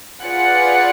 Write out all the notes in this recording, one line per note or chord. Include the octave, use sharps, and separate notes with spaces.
F4 G#4 B4 D5 F#5